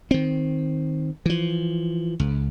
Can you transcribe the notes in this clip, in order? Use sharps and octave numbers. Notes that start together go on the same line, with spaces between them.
D#3 C4
E3 F3
C#2